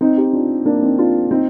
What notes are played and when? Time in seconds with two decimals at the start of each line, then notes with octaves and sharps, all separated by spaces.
0.01 C4 D#4
0.17 D#4 G4
0.33 D4 F4
0.65 A#3 D4
0.82 C4 D#4
0.99 D4 F4
1.31 C4 D#4